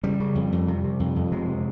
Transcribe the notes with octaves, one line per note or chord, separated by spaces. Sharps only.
C#3 G3
C#3
F2
F2
C3
C3
F2
F2
C3 G#3
C3